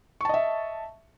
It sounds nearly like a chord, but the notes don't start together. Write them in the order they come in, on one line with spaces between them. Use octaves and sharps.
C#6 A5 D#5 E5